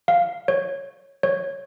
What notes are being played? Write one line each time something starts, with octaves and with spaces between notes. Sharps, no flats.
F5
C#5
C#5